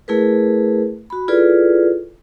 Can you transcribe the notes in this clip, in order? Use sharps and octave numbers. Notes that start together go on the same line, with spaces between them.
A3 E4 G#4 A#4 B4
F#4 B5
E4 F4 G#4 A4 B4 D5